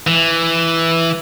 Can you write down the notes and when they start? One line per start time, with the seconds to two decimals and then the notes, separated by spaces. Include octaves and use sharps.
0.07 E3